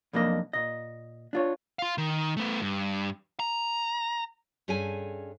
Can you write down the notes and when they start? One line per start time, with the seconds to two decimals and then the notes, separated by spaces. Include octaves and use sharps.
0.13 B1 F2 A#3 D4 D#5
0.53 A#2 D#5
1.33 D4 F4 C#5
1.79 F5 C6
1.98 D#3
2.37 A3 B3
2.62 G2
3.40 A#5
4.68 G2 C#4 G#4 A4 G#5